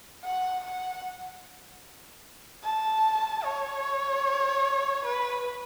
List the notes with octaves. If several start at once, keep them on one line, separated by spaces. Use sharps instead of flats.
F#5
F#5
A5
C#5
B4